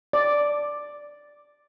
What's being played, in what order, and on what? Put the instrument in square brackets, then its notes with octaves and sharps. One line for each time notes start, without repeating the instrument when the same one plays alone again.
[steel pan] D5